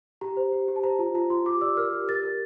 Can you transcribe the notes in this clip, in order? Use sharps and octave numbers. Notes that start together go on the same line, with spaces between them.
G4 A#5
C5
G4
G4
A5
C5 A#5
F4 A5
F4 A#5
F4 C6
G4 D6
D5 E6
A#4 F6
G4
A#4 A6
A#4